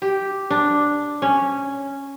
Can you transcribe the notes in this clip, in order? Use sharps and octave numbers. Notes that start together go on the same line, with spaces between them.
G4
D4
C#4